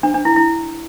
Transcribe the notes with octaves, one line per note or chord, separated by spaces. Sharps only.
D4
D4
E4
E4